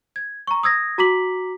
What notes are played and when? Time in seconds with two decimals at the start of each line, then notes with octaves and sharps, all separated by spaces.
0.16 G#6
0.47 A#5 C#6
0.63 D#6 E6 G#6 A#6
0.98 F#4 A#5 D6 B6 F#7